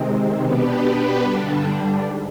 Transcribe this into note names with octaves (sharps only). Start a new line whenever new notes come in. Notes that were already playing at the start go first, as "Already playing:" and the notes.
Already playing: C3 D#3 G#3 C4
B2 B3 D4 G4 B4
G2 D3 G3 D4
G#2